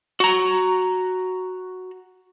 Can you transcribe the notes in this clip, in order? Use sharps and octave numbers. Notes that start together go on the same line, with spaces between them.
F#4 A#5